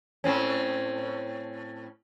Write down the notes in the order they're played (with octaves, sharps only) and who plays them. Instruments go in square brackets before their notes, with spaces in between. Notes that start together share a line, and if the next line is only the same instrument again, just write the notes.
[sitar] A2 C4 C#4